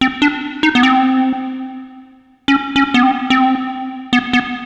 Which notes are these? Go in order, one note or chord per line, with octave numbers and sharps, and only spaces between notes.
C4
D4
D#4
B3
C4
C#4
C#4
B3
C4
C4
B3
B3